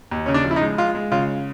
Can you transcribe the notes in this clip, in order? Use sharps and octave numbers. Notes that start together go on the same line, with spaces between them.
D#2
C#3 C#4
D4
F3
E4
D#4
G#3
G#3 F4
G#3
C#3 F4